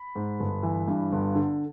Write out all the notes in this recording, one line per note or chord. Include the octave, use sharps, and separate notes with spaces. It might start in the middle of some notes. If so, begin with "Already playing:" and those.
Already playing: B5
G#2
G1
E3
G2
G1
D3